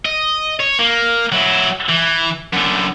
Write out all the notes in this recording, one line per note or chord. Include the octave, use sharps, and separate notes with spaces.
D#5
C#5
A#3
F#3 E4
E3
F#2 D3